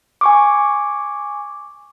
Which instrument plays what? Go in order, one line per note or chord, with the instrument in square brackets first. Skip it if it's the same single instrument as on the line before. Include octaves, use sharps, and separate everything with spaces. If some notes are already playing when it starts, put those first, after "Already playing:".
[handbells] G#5 C#6 D6